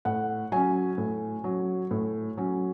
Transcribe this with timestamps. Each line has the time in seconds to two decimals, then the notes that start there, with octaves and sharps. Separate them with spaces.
0.05 A2 F#5
0.52 F#3 C#4 G#5
0.98 A2
1.44 F#3 C#4
1.91 A2
2.37 F#3 C#4